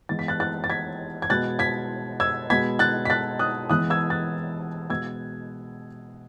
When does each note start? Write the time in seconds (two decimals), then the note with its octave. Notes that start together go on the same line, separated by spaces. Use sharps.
0.09 E3 G#3 B3 A6
0.19 B6
0.28 F#6 A6
0.40 F#6 A6
0.64 A6
0.70 G#6 B6
1.22 G#6
1.30 B2 G#3 B3 F#6 A6
1.59 G#6 B6
2.20 E6 G#6
2.50 B2 G#3 B3 G#6 B6
2.79 F#6 A6
3.05 B6
3.10 F#6 A6
3.39 D#6 F#6
3.70 E3 G#3 B3 D#6 F#6
3.90 E6 G#6
4.10 F#6 A6
4.90 B2 G#3 B3 E6 G#6